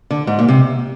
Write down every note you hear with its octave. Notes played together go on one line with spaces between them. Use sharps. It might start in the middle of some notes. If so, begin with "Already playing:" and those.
D3
G#2
A#2
C3